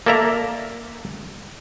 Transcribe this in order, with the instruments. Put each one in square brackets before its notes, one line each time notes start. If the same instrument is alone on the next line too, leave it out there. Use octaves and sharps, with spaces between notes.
[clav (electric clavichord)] A#3 A4 D5 E5 A#5